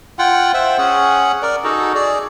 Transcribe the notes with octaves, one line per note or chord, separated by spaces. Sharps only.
F4 F#5 G5
C5 E5 F#5 G5
C#4 G#4 F#5
A#4 D5
D#4 F#4 G#4 A4
G#4 D5